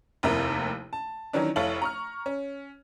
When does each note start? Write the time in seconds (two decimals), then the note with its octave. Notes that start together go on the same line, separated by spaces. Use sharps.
0.23 F1 D#2 C3 E4 A#4
0.93 A5
1.33 D#3 E3 F#3 C#4 D4
1.56 F1 E4 A4 C#5 F5 F#7
1.82 A#5 C#6 F6
2.26 C#4